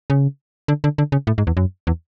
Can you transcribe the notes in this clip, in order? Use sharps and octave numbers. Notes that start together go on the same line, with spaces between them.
C#3
D3
D3
D3
C#3
A2
G#2
E2
F#2
E2